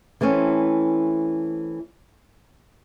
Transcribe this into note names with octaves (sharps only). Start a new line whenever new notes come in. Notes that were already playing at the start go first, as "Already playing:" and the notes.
E3 A3 C4 C#4